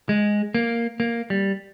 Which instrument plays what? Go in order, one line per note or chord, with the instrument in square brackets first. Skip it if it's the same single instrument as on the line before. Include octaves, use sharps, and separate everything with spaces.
[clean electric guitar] G#3
A#3
A#3
G3